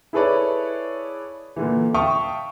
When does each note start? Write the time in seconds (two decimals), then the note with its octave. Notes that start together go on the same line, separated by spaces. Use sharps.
0.13 E4 G#4 A4 B4 C#5 D5
1.56 A#2 D3 E3
1.94 E5 F5 G5 A5 C#6 D#6